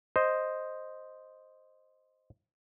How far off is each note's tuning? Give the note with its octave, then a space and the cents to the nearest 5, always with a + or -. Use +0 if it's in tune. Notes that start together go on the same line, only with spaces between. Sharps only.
C5 +0 D#5 +0